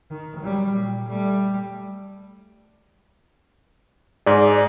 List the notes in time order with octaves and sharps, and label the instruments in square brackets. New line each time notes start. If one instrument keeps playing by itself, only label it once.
[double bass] D#3
F#3 G3
A#2
G3 A3
[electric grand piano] G#2 G#4 [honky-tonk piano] D5